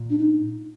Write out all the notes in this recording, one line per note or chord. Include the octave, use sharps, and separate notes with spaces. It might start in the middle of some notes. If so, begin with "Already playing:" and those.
Already playing: A#2
D4
D#4